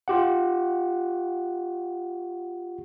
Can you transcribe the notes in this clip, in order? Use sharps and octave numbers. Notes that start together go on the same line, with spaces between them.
F4 G4 F#5